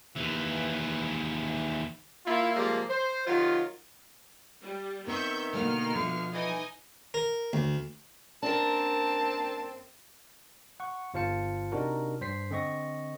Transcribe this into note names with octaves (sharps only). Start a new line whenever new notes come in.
D#2 E3
A#3 E4 F4
C3 F3 G3 G#3 A#3
C5
C3 D#3 F#3 F4
G3
D#3 B3 C4 E5 C#6 G6
B2 D3 A3 A#3 F6
D3 F3 A3
E3 D#4 D#5 G#5
A#4
D2
F#2 A#3 C4 D4 A#4 A5
F#5 C#6
G1 F4 C5 F5 A5 C#7
C3 D4 D#4 F#4 A#4
G2 C5 B6 C7
D3 C4 D#5 C#6 A#6